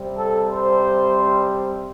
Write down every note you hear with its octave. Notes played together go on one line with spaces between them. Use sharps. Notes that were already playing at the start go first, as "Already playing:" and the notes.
Already playing: C3 G3 C4
A4
C5